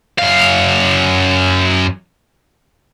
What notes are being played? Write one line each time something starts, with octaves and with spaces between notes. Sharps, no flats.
F#2 F5